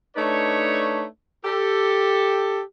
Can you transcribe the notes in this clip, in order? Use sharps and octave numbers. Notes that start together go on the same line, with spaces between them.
A3 D4 D#4 B4 C#5
G4 A4